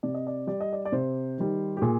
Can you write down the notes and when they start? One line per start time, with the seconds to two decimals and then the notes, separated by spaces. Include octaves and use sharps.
0.03 C3 D5
0.14 D#5
0.27 D5
0.47 G3 D5
0.61 D#5
0.73 D5
0.85 D5
0.92 C3 C5
1.38 D#3 G3
1.77 G4
1.82 A#2 G#4